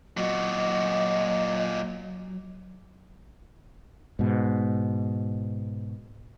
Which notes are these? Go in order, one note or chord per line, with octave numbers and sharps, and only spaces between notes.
A#2 F#3 F#4 D#5
G#2 B2